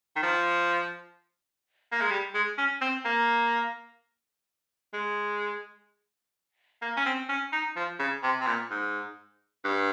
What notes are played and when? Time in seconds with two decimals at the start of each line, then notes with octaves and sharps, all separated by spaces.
0.16 D#3
0.23 F3
1.92 A#3
2.01 G#3
2.11 G3
2.34 G#3
2.58 C#4
2.81 C4
3.05 A#3
4.93 G#3
6.82 A#3
6.97 C#4
7.06 C4
7.29 C#4
7.52 D#4
7.76 F3
7.99 C#3
8.23 C3
8.41 C3
8.47 A#2
8.70 G#2
9.64 G2